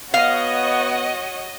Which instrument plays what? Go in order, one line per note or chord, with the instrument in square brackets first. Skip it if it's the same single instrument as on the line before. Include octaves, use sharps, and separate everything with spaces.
[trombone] B3 [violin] F#4 C#5 [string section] D#5 [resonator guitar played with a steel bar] F5